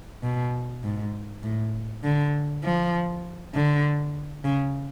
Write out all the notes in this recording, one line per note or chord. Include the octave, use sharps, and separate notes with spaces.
B2
G#2
A2
D3
F3
D3
C#3